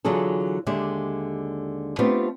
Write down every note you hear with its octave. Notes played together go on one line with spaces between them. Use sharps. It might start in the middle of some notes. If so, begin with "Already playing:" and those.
D3 E3 F#3 F4 G#4 A4
D#2 D3 G#3 G4 E5
A3 B3 C4 D4 F4 G4